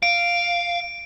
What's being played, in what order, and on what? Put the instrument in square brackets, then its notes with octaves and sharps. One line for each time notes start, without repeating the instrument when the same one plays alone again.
[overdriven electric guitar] F5 [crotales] D7